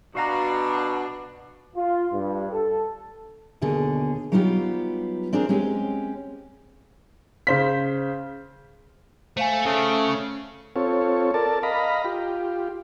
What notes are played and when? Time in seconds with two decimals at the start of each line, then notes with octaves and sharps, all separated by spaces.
0.15 B2 D4 F#4 F5 A#5
1.76 F4
2.13 G2
2.51 A4
3.62 D#2 B2 D3 G#4
4.32 F#3 G3 B3 D#4 F4 G4
5.33 C4 D4 G#4 A#4 C5
5.49 G#3 C4 C#4 G4
7.47 C#3 C5 B6
9.37 A3 C5 F5 G#5
9.66 C#3 A3
10.76 C4 F4 A4 C#5
11.34 A4 A#4 D5 A5
11.63 D#5 F5 A#5 B5
12.04 F4 G4